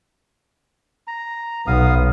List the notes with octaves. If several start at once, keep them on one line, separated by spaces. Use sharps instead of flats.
A#5
B1 B3 F5 D#6